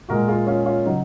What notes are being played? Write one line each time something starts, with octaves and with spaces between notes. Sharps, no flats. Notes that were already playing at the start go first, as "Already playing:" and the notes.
A#2 G#3 F#4 A#4
F4 G#4
C#4 F4
C#4 F4
C#3 F#3 D#4